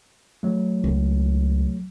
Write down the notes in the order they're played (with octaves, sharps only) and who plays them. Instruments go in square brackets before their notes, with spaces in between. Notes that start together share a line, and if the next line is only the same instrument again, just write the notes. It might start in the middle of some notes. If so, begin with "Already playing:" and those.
[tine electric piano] F#3 A3
[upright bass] C#2